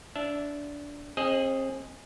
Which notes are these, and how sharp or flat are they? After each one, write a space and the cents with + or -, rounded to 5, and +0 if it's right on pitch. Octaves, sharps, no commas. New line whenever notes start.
D4 -20 E5 +0
C4 +35 G#4 +0 D#5 +0